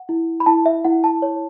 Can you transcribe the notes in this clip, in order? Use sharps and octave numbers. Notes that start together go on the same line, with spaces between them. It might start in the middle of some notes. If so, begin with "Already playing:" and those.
Already playing: F#5
E4
B5
E4 A5
E5
E4 F#5
A5
C#5